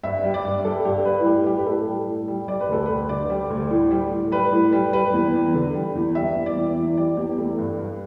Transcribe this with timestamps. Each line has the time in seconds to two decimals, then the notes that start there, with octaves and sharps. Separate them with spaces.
0.03 G2 E5
0.24 G3
0.34 D5
0.45 G2
0.65 G3 A4
0.85 G2 G4
1.05 G3 B4
1.20 E4
1.26 A2 G4
1.46 G3 G4
1.57 B4
1.66 A2 A4
1.87 G3
2.07 A2
2.28 G3
2.48 G3 D5
2.61 B4
2.69 D2 A4
2.86 D2 B4
3.09 D3 D5
3.30 G3
3.50 D2
3.71 A2
3.91 G3
4.11 A2
4.32 G3 B4
4.53 A2
4.73 G3
4.93 G3 B4
5.14 E2
5.34 E2
5.54 D3
5.75 G3
5.95 E2
6.15 G3 E5
6.35 E2
6.46 D5
6.56 E2
6.77 E3
6.97 G3 D5
7.17 E2 G4
7.38 A3 E4
7.58 G2
7.79 G2